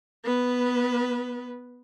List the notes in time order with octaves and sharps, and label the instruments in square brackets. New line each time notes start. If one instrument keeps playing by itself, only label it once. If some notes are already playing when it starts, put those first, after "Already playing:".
[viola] B3 B4